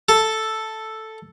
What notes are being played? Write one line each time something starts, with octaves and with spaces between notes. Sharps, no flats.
A4